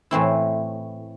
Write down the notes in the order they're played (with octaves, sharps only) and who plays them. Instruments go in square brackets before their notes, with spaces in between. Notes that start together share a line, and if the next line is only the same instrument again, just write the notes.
[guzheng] A2 E3 C4 E4